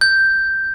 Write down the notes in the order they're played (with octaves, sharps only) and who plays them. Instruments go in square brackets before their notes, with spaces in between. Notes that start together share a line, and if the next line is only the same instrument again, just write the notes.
[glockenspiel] G6